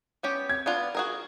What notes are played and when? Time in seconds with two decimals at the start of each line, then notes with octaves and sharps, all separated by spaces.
0.23 B3 C#4 G4
0.49 G#6
0.66 B3 D4 F4
0.95 F#4 G#4 A#4